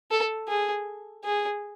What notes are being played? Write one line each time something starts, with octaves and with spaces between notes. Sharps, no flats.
A4
G#4
G#4